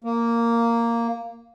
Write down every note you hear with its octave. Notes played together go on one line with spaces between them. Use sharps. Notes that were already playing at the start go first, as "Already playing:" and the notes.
A#3